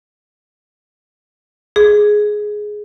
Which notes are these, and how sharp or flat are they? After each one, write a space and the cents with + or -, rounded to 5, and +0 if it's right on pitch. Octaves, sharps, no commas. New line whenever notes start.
G#4 +10